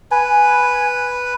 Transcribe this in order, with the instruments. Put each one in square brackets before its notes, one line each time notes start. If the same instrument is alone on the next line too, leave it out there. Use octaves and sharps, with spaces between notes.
[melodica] B4 [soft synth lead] G#5